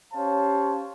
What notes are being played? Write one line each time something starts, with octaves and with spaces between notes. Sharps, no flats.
C#4 G4 C5 C#5 F5 A5